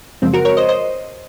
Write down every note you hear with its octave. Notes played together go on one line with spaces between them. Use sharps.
F#2 C#3 F3 G#3 C4
F#4 A#4
A#4 C#5
C5 D#5
C5 D#5